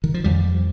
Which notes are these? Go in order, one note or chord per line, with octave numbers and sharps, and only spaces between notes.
D#3
F3
F2 G3